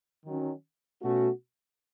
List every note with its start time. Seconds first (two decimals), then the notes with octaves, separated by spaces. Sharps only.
0.25 D#3 F#3 C#4
1.02 B2 A3 C#4 F#4